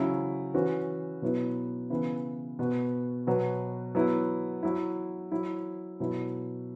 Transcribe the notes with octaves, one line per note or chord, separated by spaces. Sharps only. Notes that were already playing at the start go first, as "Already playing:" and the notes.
Already playing: C#3 F#3 E4
E3 C#4 F#4
B2 F#3 B3 E4
C#3 E3 B3 E4
B2 B3 F#4
B2 F#3 B3
F#3 B3 E4
F#3 E4
F#3 E4
B2 F#3 E4